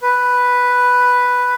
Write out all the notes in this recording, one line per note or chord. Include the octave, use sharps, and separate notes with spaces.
B4